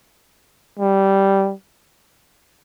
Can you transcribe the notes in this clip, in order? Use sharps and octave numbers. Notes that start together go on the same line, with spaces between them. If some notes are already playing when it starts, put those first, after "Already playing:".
G3